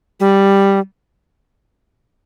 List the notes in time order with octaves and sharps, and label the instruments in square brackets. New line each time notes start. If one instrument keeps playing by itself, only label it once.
[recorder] G3